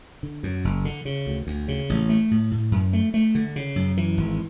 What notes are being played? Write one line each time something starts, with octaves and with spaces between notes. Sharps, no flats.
D3
F#2
F#1
D3
C#3
D2
D2
C#3
A1
A3
A2
A2
F#2
A3
A3
D3
C#3
F#2
E3
G#1